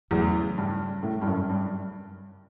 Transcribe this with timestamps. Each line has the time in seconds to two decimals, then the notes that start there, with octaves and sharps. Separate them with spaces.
0.11 E2 C#3 F#3 A3
0.58 G2
1.03 A2
1.22 G2
1.26 F#2
1.49 G2